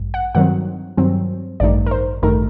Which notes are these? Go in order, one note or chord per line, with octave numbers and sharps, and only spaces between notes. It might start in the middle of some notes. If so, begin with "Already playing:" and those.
Already playing: A1 G2
F#5
G2 D#3 F#3 C4 F#5
G2 D#3 F#3 C4
A1 G2 D#3 A3 D#4 D5
A#4
C5
A1 G2 D#3 A3 D#4 A#4